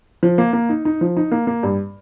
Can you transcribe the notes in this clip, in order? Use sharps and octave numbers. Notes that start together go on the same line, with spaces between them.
F3
A#3
A#3
D#4
D#4
F3
D#4
A#3
A#3
G2